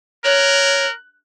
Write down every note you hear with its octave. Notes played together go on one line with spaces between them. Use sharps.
A#4 C#5 F#6